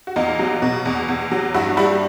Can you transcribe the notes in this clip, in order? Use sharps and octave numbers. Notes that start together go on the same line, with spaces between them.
F#4
E2 D#4 F4
F#3
B2
E2
E2
F#3
G2 E4 F#4
G3 E4 F#4